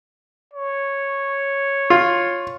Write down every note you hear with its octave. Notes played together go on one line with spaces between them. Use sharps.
C#5
F4